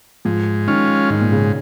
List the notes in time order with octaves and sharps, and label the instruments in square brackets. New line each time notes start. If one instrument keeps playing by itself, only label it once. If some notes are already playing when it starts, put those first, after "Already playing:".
[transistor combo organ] G#2 [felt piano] F3
[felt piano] D#3 [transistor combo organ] G#3 C#4 F4
[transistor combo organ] G#2 [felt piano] D#3
[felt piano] A#2
C#3